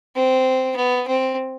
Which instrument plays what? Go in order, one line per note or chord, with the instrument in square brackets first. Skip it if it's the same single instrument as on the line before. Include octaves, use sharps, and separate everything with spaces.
[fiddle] C4
B3
C4